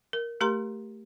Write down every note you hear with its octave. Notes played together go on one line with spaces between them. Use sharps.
A#4
A3 G4 A#4 A#5 C6